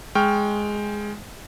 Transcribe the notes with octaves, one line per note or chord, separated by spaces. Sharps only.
G#3 G5 C#6 F6